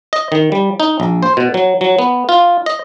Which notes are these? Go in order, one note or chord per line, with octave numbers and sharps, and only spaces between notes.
D#5
D#3
G3
D#4
A#1
C5
B2
F#3
F#3
B3
F4
D#5